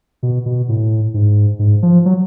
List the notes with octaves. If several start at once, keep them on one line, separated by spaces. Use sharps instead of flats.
B2
B2
A2
G#2
G#2
F3
F#3